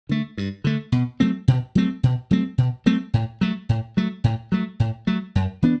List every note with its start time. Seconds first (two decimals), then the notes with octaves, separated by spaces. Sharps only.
0.09 D3 A3
0.38 G2
0.64 D3 A3
0.92 B2
1.20 F#3 A3 C4
1.48 B2
1.75 F#3 A3 C4
2.03 B2
2.31 F#3 A3 C4
2.58 B2
2.86 F#3 A3 C4
3.14 A2
3.41 F#3 A3
3.69 A2
3.97 F#3 A3
4.24 A2
4.52 F#3 A3
4.80 A2
5.07 F#3 A3
5.35 F#2
5.62 E3 B3 D4